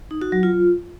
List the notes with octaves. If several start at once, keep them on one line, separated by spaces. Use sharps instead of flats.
D#4
F#4
F#3
F4